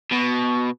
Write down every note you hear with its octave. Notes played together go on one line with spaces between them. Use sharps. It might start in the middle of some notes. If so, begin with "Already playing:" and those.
B2